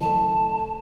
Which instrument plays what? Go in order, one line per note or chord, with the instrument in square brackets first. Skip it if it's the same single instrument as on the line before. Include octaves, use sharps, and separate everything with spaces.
[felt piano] F#1 A3 [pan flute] A5